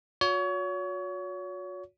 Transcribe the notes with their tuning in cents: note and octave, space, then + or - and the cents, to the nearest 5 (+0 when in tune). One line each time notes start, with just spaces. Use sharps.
F#4 -40 C#5 +30